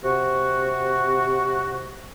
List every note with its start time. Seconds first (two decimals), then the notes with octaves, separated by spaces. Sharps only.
0.04 C3 F#4